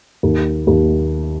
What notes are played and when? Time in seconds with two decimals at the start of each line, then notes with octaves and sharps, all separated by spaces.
0.23 D#2
0.67 D#2